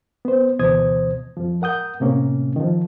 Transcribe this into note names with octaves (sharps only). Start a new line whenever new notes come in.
B3 C5
D2 B2 E3 C5 D#6 G#6
F2 F3
A#4 F#5 D#6 G6
A2 C3 A#3 C#4
D#3 F3